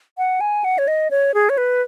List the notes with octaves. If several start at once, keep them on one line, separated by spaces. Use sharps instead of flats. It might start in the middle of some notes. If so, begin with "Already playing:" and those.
F#5
G#5
F#5
C#5
D#5
C#5
G#4
C#5
B4